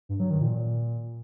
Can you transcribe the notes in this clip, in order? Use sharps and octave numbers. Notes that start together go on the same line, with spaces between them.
G2
F#3
D#3
A#2